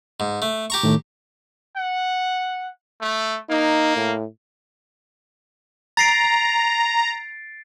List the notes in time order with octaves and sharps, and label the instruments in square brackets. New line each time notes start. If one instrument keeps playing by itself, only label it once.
[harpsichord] G#2
A3
G4 A#5 C#6
[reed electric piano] A2 D#3 A3
[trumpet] F#5
A3
[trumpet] A#3 [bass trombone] D#4
[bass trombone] A2
[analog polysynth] A#5 [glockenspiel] A6 C7 D7